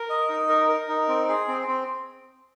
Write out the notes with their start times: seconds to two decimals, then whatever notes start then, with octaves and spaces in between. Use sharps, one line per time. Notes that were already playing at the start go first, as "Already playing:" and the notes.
Already playing: A#4
0.10 D#5
0.29 D#4
0.49 A#4
0.69 A#4
0.88 D#4
1.08 C4
1.29 G#4
1.48 C4
1.68 C4